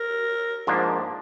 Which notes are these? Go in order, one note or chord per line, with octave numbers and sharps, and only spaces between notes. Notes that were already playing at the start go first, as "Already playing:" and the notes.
Already playing: A#4
G#2 F3 A#3 D4